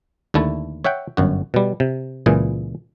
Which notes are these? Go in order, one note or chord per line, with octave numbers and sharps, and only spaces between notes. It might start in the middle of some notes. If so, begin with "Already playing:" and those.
D#2 D3 A3 E4 A5
C#5 E5 F#5 G5
G1 F#2 F#4
B2 G3
C3
C#2 A#2 E3 G#4